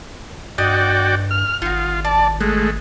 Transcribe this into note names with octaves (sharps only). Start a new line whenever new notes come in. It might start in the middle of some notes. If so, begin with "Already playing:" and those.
G2 F#4 D5 D#5 G5
F6
G#1 D#4 F4 F#4
D5 A5
G#3 A3 F#6